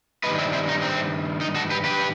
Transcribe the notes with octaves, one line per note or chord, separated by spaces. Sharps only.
G2 D#3 G3 B4 D#5
C4 E4
C4 E4
D#4
C4
D#4
F#4 A4
G4 B4
G4 B4